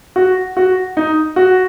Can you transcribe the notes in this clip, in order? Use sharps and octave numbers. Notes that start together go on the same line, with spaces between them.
F#4
F#4
D#4
F#4